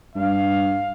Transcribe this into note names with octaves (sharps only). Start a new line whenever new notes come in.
G2 F5